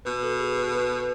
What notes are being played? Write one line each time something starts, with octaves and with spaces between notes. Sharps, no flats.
B2 B4
A4
G#4
B4
B4